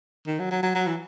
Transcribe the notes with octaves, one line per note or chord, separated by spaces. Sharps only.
D#3
F#3
F#3
F#3
F#3
E3